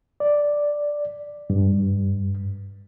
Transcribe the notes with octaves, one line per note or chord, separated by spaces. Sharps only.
D5
G2